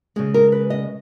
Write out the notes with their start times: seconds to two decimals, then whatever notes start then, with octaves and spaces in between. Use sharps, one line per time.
0.16 C#3 G#3 G#4
0.34 A#4
0.52 B4
0.70 D#5